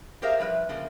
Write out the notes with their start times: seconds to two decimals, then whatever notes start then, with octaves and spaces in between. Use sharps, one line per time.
0.22 G4 G#4 A#4 C5 E5 F5
0.39 F3 G3 B4 E5
0.69 C#3 F3 A3 A#3